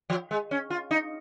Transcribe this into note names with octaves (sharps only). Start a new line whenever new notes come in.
F3
G#3
C#4
F4
D#4